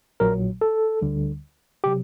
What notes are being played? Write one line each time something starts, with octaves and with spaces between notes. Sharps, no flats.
A#1 A#2 F#3 A#4
A4
D2 D3 G3
C3 F#3 G4